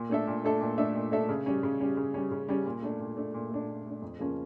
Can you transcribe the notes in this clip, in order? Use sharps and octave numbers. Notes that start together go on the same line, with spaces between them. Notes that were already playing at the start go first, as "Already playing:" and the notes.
Already playing: A#2
A3 D4 A4 E5
A#2
A3 D4 A4 E5
A#2
A3 D4 A4 E5
A#2
A3 D4 A4 E5
C#3
G3 C#4
C#3
G3 C#4
C#3
G3 C#4
C#3
G3 C#4
A#2
A3 D4
A#2
A3 D4
A#2
A3 D4
A#2
A3 D4
F2
C#3 F3 A#3 C#4